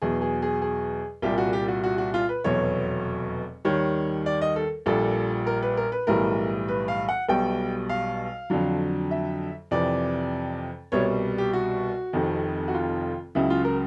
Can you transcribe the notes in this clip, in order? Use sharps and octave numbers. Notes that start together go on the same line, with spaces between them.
E2 B2 F#3 G#4
G#4
G#4
G#4
C2 A#2 G3 G4
F#4
G4
F#4
F#4
F#4
F4
B4
F1 E2 B2 F#3 C#5
D#2 D#3 G3 C#5
D5
D#5
A4
A#1 A#2 G3 A4
A#4
B4
A#4
B4
B1 A2 E3 G3 A#4
B4
F5
F#5
B1 B2 G3 G5
F5
F2 D3 F#3
E5
F2 C3 E3 D5
C2 B2 G3 C#5
G4
F#4
F1 F2 C3 D#3
F#4
F4
C#2 C#3 F#3 E4
F4
A#4